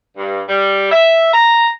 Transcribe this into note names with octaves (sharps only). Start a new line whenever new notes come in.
G2
G3
E5
A#5